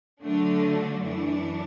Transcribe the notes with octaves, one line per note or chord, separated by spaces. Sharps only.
D3 F#3 A3 D4
F#2 E3 D4